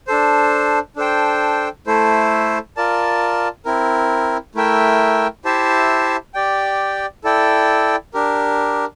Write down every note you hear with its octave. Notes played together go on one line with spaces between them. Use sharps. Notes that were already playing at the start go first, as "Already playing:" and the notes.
D4 A4 C5
D4 A4 C5 G5
A3 E4 A4 C5
F4 A#4 D5 A5
C4 E4 A#4
A3 E4 A#4 E5 G5
E4 G4 C5 E5 A5
G4 D5 G5
E4 A4 D5 G5
D4 G4 A#4